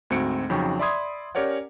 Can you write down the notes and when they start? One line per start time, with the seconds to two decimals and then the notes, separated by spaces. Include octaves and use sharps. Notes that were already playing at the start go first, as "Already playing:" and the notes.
0.10 D2 G#2 C4 F#4 C#7 D7
0.50 F2 C#3 F#3 D#4 G5 C#6
0.79 D5 E5 B5 C6 D#6 G#6
1.35 C#4 G4 A#4 C#5 D5 F#5